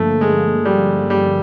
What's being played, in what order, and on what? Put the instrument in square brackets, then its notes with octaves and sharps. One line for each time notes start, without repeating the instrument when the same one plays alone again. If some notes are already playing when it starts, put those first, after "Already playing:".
Already playing: [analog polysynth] G2 D3 F3 A#3 [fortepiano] A3
[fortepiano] G#3
G3
G3